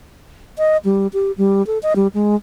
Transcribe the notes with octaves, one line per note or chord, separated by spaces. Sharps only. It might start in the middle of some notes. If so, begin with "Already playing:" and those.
D#5
G3
G4
G3
A4
D#5
G3
G#3